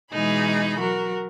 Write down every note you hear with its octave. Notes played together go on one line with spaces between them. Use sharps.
B2 E3 G#3 D#4 G#4 B5
F#3 F#4 A#4